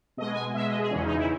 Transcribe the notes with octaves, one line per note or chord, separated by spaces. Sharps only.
B2 G#3 D#5
G#5
B2 G#3 E5
D#5
G#4
E2 C#3 E3 C#4
D#4
E4